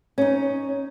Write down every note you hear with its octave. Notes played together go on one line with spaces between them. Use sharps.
C#4 D#4